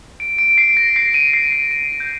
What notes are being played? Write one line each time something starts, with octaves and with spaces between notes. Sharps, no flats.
D7
D7
C7
A#6
C7
D#7
C7
D#7
D#7
G6